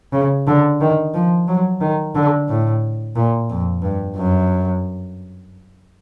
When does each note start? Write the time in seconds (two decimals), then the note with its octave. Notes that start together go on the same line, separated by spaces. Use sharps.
0.13 C#3
0.47 D3
0.81 D#3
1.14 F3
1.48 F#3
1.81 D#3
2.15 D3
2.49 A2
3.16 A#2
3.50 F2
3.82 G2
4.17 F#2